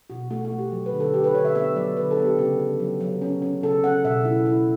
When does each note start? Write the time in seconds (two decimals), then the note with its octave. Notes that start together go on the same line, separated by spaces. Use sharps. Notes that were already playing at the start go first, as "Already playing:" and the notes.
0.10 B2 F#4
0.30 A3 F#4
0.45 F#4
0.52 A3
0.58 G4
0.72 F#3
0.86 B4
0.93 D3
1.00 A4
1.14 D3 G4
1.24 B4
1.34 D3 C#5
1.45 E5
1.55 B3 E5
1.76 F#3 D5
1.97 D3 B4
2.11 A4
2.17 B3
2.25 G4
2.38 C#3 G4
2.59 C#3
2.79 F#3
3.01 F#3
3.22 C#4
3.42 C#4
3.63 C#3 A4
3.84 C#4 F#5
4.05 B2 E5
4.25 E4
4.45 E4